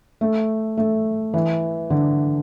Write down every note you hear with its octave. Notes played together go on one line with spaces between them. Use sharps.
A3
A3
E3
D3